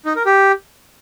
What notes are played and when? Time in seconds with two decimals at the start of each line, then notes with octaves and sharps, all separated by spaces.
0.06 D#4
0.16 A#4
0.26 G4